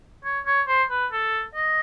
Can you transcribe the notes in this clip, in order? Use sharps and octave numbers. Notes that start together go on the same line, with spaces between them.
C#5
C#5
C5
B4
A4
D#5